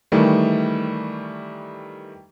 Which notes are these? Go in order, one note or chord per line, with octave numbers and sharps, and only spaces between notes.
D#3 E3 G3 A3